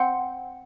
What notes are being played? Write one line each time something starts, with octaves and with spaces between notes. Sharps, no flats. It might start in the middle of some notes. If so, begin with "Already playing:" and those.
Already playing: C4 F#5